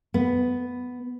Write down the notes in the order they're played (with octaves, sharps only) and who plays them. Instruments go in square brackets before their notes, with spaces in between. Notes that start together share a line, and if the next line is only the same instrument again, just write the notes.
[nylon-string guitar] B3